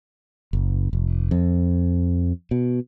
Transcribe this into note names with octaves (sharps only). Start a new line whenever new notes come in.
F#1
F1
F2
B2